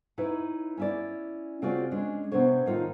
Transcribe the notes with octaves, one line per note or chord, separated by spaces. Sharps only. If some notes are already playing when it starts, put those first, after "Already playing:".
D#4 E4 B4 C#5
C#4 E4 D5
C#3 C4 F4 F#4 D5
G#3 C#4 D4
C3 B3 D4 C5 C#5
A2 D#3 D#4 F4